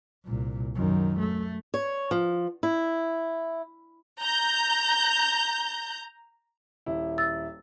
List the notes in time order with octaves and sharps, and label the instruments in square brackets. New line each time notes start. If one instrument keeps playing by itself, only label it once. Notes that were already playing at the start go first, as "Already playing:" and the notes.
[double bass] C2 A#2
F#2 D#3
A3
[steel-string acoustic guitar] C#5
F3
E4
[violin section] A#5 G6
[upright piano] D#1 E4
[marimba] E6 A6